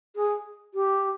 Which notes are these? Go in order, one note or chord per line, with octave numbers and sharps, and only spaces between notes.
G#4
G4